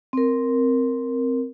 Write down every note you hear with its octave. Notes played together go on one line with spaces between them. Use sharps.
C4 A#4